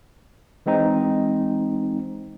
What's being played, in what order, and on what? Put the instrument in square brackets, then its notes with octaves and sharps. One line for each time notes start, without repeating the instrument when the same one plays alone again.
[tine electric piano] E3 G#3 C4 D#4